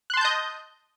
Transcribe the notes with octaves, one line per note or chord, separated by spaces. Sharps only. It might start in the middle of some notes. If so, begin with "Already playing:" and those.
D#5 A5 C6 F#6 G6